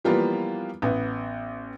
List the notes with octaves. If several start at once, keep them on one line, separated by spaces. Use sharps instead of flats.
E3 F3 G3 A#3 B3 F4
A1 B3